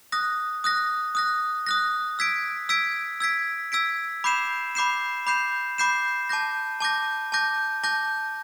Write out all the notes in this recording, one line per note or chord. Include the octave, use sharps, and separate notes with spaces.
D#6 F#6 A#6
D#6 F#6 A#6
D#6 F#6 A#6
D#6 F#6 A#6
E6 G#6 B6 D7
E6 G#6 B6 D7
E6 G#6 B6 D7
E6 G#6 B6 D7
B5 D6 G6 C7 E7
B5 D6 G6 C7 E7
B5 D6 G6 C7 E7
B5 D6 G6 C7 E7
A5 D6 G6 A#6
A5 D6 G6 A#6
A5 D6 G6 A#6
A5 D6 G6 A#6